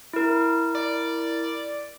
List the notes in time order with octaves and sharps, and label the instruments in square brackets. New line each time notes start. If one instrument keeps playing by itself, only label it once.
[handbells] E4 A#4
[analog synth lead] D5